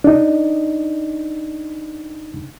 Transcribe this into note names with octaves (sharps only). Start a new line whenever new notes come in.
D4 D#4